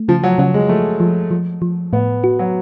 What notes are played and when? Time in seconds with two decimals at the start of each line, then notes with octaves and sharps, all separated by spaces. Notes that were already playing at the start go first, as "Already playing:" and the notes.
Already playing: A3
0.08 C#3 F3
0.23 F#3
0.38 C#3 F#3
0.54 G#3
0.69 F3 A3
1.00 F3
1.31 F3
1.62 F3
1.93 A2 B3
2.24 F#4
2.39 F#3